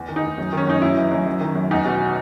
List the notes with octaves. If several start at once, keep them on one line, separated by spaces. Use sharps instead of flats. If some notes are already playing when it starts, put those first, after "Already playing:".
Already playing: E2
D#3
D#4
E2
F#2
D#3 C#4
F#2 D#4
F#2 E4
E3
F#2
F#2
D#3
F#2
E2 D#4
B2